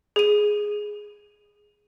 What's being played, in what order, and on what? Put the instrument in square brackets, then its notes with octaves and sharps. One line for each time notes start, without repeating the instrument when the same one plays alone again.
[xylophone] G#4 D#7